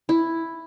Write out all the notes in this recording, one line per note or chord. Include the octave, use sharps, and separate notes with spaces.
E4